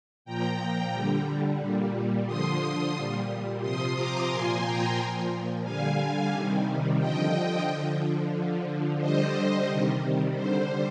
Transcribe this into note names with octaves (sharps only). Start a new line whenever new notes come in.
A#2 F3 G5 A#5
D3 G3
A#2 G3
D3 F3 C6 D#6
A#2 G3
C3 F3 C6 D#6
A#5 D6
A#2 F3 G#5 C6
G5 A#5
A#2 F3
D3 G3 F5 G#5
C3 D#3 G3
D3 F3 D#5 G5
D3 F3
D3 F3
D3 G3 C5 D#5
C3 D#3 G3
D3 G3 C5